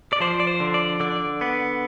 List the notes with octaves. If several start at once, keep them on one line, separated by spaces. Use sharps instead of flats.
D5
F3 C5
D5
C5
D3
D5
D3 D5
B3